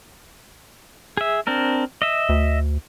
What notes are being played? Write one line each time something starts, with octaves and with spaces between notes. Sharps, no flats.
G#4 E5
C4 D4 A#4
D#5 E5
D2